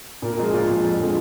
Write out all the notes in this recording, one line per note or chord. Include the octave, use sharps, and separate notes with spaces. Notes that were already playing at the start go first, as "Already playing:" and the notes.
A#2 A#4
A#4
F3 G#3 G#4
A#2 F4
F3 G#3
F2
D3 F3 G#3